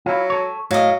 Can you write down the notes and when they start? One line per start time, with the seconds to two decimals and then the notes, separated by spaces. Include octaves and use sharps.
0.06 F#3 E4 F4
0.30 A4 C#5
0.71 A2 F#3 D#5 F5